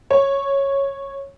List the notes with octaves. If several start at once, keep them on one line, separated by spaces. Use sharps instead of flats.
C#5